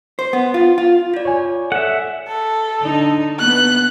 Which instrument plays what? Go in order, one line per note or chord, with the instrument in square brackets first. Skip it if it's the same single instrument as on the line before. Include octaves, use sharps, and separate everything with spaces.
[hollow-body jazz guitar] C5
B3
F4
F4
[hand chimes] F4 D5
[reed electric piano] C#5 G#5
[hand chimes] A4 [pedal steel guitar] E5 F#5
[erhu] A4
[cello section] D3 D#4
[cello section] B3 [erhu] F#6